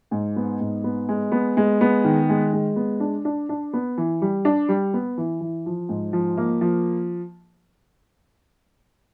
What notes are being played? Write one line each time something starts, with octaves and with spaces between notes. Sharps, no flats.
G#2
B3
G#2
B3
G#3
B3
G#3
B3
D#3
G#3
G#3
B3
D4
D4
D4
B3
E3
G3
D4
G3
B3
E3
E3
F3
G#2
F3
A#3
F3